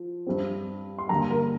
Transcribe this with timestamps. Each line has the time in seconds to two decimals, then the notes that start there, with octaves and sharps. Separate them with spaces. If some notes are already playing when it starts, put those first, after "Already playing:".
Already playing: F3
0.27 G2 G3 C4
0.98 C6
1.09 G2 D3 A#3 A#5
1.31 A#4